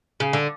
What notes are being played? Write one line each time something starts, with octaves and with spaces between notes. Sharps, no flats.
C#3
D3